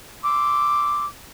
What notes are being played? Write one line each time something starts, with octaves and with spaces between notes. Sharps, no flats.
C6 D6 E6